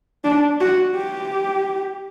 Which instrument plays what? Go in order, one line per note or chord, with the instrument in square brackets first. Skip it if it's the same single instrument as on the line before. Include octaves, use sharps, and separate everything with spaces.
[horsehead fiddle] D4
F#4
G4